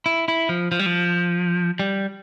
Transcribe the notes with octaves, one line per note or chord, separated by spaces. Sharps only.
E4
E4
F3
F3
G3
F3
G3